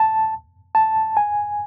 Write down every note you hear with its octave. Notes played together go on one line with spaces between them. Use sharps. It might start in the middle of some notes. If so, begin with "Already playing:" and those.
Already playing: A5
A5
G#5